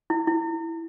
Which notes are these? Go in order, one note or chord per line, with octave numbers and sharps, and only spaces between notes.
E4
E4